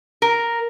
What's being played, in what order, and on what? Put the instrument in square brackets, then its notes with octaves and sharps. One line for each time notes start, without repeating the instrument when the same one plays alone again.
[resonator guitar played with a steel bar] A#4